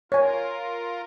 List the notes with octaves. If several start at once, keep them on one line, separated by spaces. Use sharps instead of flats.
F4 A#4 C#5 G#5